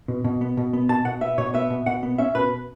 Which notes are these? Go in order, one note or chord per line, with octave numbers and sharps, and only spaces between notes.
B2
B2
B3
B2
B3
B2 A5
B2 F#5
B3 E5
B2 C#5
B3 E5
B2
B2 F#5
B3
C#4 E5
B2 B4